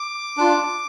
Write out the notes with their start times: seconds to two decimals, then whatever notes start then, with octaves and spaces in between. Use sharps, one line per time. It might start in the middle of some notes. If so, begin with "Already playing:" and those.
Already playing: D6
0.37 D4 F4